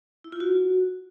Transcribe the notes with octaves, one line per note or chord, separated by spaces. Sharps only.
E4
F4
F#4